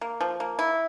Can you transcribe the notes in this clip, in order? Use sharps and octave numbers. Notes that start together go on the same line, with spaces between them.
A#3
F3
A#3
E4